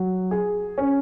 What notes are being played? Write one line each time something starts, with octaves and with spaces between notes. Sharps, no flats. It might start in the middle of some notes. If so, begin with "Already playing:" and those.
Already playing: F#3
G#4
C#4